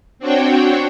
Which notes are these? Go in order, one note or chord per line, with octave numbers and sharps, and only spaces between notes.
C4 D4 F#4 C#5 G5